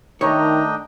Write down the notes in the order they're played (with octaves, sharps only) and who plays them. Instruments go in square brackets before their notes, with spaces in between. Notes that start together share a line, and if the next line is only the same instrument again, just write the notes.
[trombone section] D#3 [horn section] A3 A#5 [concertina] D4 D#5 G5 [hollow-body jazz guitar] C#5